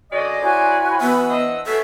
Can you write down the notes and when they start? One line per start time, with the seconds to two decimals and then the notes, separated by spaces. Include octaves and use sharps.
0.12 D3 G#3 C#4 F#4 D5 D#5
0.42 E4 F#4 C5 C#5 G#5 B5
1.01 E3 B3 F#5 E6
1.29 D4 C5 D#5
1.66 B2 C#4 A4 E5